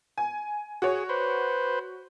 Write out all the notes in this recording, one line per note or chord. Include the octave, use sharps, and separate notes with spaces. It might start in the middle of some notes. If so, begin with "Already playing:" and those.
G#5
F#4 G#4 C#5
B4 C5